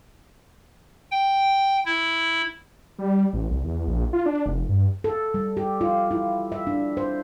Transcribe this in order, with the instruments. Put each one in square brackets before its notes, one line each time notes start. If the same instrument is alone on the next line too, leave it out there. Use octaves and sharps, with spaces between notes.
[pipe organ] G5
E4
[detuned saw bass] G3
A1
C2
E2
A#1
F4
D4
F1
G2
[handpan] A4
G3
G4
F4
E4
E5
D4
C5